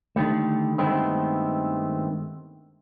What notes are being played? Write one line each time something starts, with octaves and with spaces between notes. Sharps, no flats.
D3 D#3 G3 A3
G2 D#3 G#3 A3 B3 C4